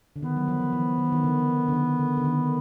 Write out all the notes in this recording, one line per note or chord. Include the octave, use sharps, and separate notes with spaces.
D3
D#3 B3
F#3
F3
F3
E3
D#3
D#3
D3
D3
D#3
D3
D3
D#3